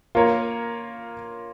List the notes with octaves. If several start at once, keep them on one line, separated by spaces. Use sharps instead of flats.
A#3 F4 A#4 C#5